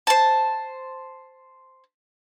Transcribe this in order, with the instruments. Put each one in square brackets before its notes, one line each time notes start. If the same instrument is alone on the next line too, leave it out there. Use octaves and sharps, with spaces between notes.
[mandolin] C5 A5